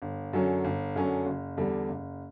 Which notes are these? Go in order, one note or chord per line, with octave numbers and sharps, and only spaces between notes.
G1
F#2 D3 F#3 C#4
G1
F#2 D3 F#3 C#4
F#1
E2 D3 G3
F#1